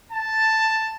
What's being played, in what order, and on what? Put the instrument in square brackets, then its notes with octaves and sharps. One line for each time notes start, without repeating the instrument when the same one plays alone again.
[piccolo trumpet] A5